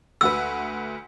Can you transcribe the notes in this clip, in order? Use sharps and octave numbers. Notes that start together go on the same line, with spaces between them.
D2 F#4 B4 E6